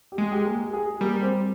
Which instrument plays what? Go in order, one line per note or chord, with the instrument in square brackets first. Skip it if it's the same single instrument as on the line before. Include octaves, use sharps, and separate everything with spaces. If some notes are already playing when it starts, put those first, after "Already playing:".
[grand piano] G4
[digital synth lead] G#3 [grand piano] G#4
[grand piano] G4
G#4
A#3 A#4
G#4
[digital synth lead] G3 [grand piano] A#3 A#4
[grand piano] C4 C5